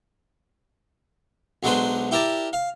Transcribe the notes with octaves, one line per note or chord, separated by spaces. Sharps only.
B1 F#3 G#3 D4 B4 C5
E4 G4 A#4 D5 A5
F5